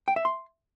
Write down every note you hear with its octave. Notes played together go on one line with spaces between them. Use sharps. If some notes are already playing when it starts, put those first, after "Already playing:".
G5
E5
C6